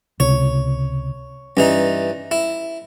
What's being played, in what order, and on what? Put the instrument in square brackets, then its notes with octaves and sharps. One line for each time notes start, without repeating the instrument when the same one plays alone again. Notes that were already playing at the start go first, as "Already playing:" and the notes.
[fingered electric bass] C#2 C3 [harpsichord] C#5
[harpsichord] G2 E3 D#4 [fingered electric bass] C#4
[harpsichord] E4